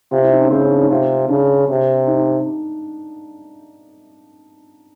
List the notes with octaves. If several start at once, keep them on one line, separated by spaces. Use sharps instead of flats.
C3 F4
E4
D#4
C#4
C#3 C4
C#4
D4
D#4
C3 F4
C#3 D4
C3
D#4